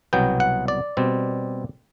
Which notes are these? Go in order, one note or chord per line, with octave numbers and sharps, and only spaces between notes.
C2 B2 F#3 B3 G5
F#5
D5
B2 G3 C4